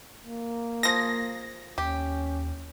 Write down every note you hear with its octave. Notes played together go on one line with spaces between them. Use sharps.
A#3
F3 G#4 A#6
D#2 C#4 G4